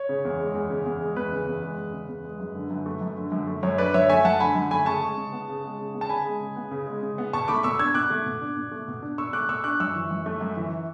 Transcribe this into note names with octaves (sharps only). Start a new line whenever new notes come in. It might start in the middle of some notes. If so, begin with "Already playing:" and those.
Already playing: C#5
C#3
E2
G#3
E2
C#3
E2
G#3
E2 B4
C#3
E2
G#3
E2
C#3
E2
G#3
F#2
D3
F#2
A3
F#2
D3
F#2
A3
F#2 C#5
D3 B4 D5
F#2 C#5 E5
A3 E5 G#5
F#2 F#5 A5
D3 G#5 B5
F#2
A3 G#5 B5
C#3 A5 C#6
G#3
C#3
B3
C#3
G#3
C#3
B3
A5
C#3 G#5 B5
G#3
C#3
B3
C#3
G#3
C#3
B3
B2 A5 C#6
A3 B5 D6
B2 C#6 E6
D4 E6 G#6
B2 D6 F#6
A3
B2
D4
B2
A3
B2
D4
B2 C#6 E6
A3 D6 F#6
B2 C#6 E6
D4 D6 F#6
F#2 C#6 E6
E3
F#2
A3
F#2
E3